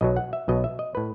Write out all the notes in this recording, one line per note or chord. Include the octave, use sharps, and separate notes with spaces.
B1 B2 F#3 D#5
F#5
E5
B1 B2 F#3 D#5
E5
D#5
A2 B4